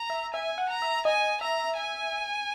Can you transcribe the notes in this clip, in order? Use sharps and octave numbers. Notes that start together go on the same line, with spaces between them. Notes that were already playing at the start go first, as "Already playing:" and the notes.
Already playing: A#5
E5
E5 G#5
F#5
A#5
E5
D#5 G#5
E5 A#5
G#5